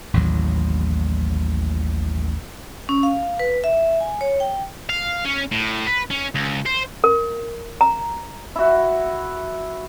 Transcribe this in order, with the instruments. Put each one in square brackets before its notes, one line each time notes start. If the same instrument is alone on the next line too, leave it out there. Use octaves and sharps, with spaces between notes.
[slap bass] A1 D#2 A2 F#3
[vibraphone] C#4
F5
B4
E5
G#5
C#5
G5
[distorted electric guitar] F5
C#4
A2
B4
C#4
C#2
C5
[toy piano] A#4
A#5
[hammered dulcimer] E4 F#4